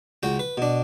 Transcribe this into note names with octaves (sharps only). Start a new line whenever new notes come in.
C#2 F#4 G5
B4
B2 D4